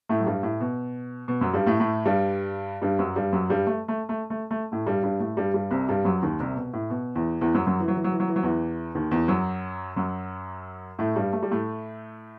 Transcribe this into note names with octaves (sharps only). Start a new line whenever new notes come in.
A2 A3
F#3
G2 G3
A2
B2
B2
F#2 F#3
G2 G3
A2 A3
A2 A3
G2 G3
G2 G3
F#2 F#3
G2 G3
F#2 F#3
G2 G3
A3
A3
A3
A3
A3
A2 A3
G2 G3
G2 G3
A2 A3
G2 G3
G2 G3
C2 C3
G2 G3
F#2 F#3
D#2 D#3
C2 C3
B2
A2
B2
E2 E3
E2 E3
F#2 F#3
F#2 F#3
E3
F#3
E3
F#3
E3
F#3
E3
F#3
E2 E3
D#2 D#3
E2 E3
F#2 F#3
F#2 F#3
A2 A3
G2 G3
A3
G3
A2 A3